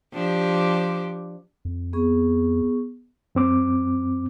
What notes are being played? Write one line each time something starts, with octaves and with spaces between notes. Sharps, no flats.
F3 D4 G4
F2
B3 G#4 C#6
F#2 C4 D6